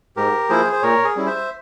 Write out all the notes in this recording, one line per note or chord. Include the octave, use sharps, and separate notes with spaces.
G#2 G4 A#4
F3 A#3 E4 G#4 C5
C5
A#2 A#4 C#5
G#4
G3 C#4 E4
C5 E5